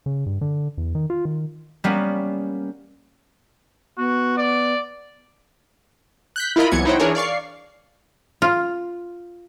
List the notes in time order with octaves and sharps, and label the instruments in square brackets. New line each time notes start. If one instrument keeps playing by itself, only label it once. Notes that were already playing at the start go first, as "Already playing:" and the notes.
[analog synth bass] C#3
G2
D3
E2
D#3
F4
D#3
[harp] G3 A#3 B3 C#4
[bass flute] B3 [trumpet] F#4
[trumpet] D5
[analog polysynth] F#6 G6 B6
E4 F4 A#4 D#5 B5
C2 E3 F#3 B3 G#6 C#7
D#4 E4 C5 C#5 F#5 G5
E3 D4 G#4 A#4 C#5
D5 F5 C#6 C7
[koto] F4